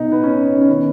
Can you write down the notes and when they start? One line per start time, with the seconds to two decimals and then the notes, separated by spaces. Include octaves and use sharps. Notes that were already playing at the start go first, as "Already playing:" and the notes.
Already playing: B1 B2 D#4
0.12 B3
0.23 C#4
0.61 C#4
0.68 D#3 B3